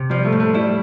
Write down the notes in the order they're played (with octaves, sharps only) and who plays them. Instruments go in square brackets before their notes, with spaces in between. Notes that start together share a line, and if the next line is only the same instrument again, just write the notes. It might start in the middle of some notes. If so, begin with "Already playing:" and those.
Already playing: [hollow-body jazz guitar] C3
[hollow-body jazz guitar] F3 [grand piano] G3
[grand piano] A3
[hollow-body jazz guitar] A2
[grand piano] A3
[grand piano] G3 [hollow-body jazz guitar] E4